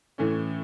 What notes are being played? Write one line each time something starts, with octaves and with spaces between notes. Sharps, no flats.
A2 E3 A3 C#4